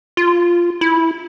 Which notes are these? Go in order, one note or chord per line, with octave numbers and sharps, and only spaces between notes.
F4
E4